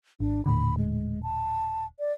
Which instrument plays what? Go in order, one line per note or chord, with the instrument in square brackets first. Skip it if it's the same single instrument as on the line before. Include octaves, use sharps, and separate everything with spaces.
[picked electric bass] G#1 [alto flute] D4
[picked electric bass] D#1 A2 D3 [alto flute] B5
[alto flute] G#3
A5
D5